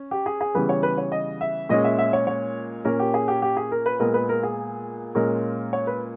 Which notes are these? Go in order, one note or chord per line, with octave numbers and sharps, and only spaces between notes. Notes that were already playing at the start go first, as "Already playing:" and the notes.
Already playing: C#4
G4
G#4
G#4
C#3 E3 G3 B3 B4
C#5
B4
C#5
D#5
E5
A#2 G#3 C#4 D#5
E5
E5
C#5
C#5
A#2 A#3 C#4 A#4
G4
G#4
G4
G4
G#4
A#4
B4
A#2 G#3 B3 A#4
B4
A#4
G#4
A#2 G#3 C#4 A#4
C#5
B4